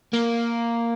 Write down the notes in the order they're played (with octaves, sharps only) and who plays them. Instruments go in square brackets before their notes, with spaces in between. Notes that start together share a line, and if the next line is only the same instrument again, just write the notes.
[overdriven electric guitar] A#3